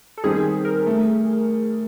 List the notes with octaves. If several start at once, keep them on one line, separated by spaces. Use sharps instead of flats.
A4
D#3 G3 C4 G#4
A#4
A3